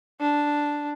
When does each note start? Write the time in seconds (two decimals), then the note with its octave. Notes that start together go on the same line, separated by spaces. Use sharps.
0.20 D4